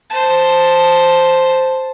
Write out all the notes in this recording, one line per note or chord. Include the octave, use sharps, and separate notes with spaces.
C5 A5